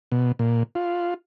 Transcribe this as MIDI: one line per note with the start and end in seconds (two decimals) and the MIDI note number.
0.12 0.32 47
0.39 0.63 46
0.75 1.14 65